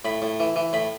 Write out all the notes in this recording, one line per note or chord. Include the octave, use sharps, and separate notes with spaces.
A2 B5
A2
E3
E3
A2 B5